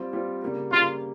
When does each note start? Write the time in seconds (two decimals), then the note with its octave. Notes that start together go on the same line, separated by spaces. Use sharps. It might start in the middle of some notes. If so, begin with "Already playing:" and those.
Already playing: G3 C4 F4
0.12 G3 C4 F4
0.42 C#3 G3 A#3
0.72 C#3 G3 A#3 F4